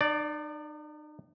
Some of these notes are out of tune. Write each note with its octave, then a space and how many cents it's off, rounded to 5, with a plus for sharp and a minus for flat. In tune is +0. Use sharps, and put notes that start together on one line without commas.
D#4 -45 D5 +0